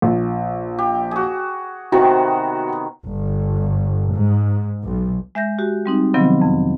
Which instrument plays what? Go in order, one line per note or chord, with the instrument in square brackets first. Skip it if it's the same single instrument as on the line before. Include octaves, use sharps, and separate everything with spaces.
[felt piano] A#1
[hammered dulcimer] G4
F#4 G#4
[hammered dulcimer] C3 D#3 B3 [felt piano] F#4
[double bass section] G1
G#2
B1
[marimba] G#3 E5 G6 A#6
F#4 G4
G3 C4 D#4
C3 D#3 F3 F#3 B3 C4
F2